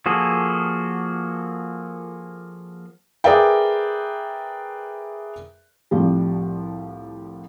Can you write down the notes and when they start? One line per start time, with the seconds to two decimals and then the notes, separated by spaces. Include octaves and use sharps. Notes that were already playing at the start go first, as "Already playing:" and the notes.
0.06 F3 A#3 F#4 G#4 A4
3.24 G#4 A#4 B4 D5 E5 G5
5.91 C2 A2 F3 G3